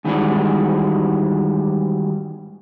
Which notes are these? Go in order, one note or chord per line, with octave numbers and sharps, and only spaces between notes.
G#2 D#3 E3 G3 G#3 F#4